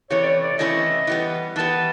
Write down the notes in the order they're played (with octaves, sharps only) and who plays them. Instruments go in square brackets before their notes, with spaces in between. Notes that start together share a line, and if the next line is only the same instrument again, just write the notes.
[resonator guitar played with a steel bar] C3 E3 A3 C#4 E4 [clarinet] C#5
[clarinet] D5
C#5
D5
[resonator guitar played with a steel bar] C3 E3 A3 C#4 E4 [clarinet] D#5
[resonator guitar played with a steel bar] E3 G3 B3
[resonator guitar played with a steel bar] E3 G3 B3 [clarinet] A5